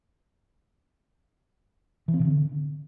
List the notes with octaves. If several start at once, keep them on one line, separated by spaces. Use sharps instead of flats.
E3
C4
C3
D3